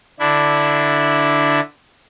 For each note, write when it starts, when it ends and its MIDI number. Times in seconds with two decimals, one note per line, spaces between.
0.19 1.60 50
0.19 1.60 62
0.19 1.60 64